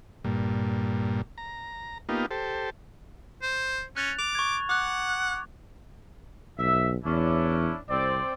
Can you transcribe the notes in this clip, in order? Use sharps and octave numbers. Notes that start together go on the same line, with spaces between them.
G2 A#2
A#5
A#3 B3 D#4 F4 G4
G4 A4 C5
C5
C#4 F#6 A6 F7
D6 F7
C#6 G#6
F#5 D6 F#6
B1 E5
E2 C#4 D4 E4
C2 C4 D5